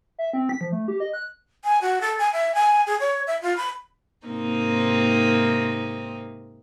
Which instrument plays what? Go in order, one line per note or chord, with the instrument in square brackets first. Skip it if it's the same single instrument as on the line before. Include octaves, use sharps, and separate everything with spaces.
[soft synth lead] E5
C4
B6
F3
A3
G4
D#5
F#6
[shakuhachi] G#5
F#4
A4
G#5
E5
G#5
G#4
C#5
E5
F4
B5
[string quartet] G#2 C3 A#3 C4 D#4